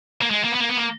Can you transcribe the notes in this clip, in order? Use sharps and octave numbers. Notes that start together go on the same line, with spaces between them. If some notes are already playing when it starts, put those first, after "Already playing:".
A#3
G#3
A#3
B3
A#3
B3
A#3